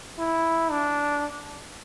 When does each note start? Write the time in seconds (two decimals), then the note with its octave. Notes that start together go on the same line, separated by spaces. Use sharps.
0.19 E4
0.71 D4